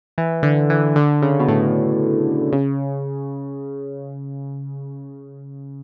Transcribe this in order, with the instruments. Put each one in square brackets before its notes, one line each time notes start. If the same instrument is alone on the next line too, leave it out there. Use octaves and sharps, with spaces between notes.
[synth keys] E3
D3
E3
D3
C#3
B2
A2
C#3